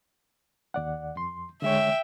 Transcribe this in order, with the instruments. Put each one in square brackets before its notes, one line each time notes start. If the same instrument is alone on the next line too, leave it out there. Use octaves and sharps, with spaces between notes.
[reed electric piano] D#2 D5 F#5
F2 C6
[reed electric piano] D3 G#3 C#5 [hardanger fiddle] E5 G5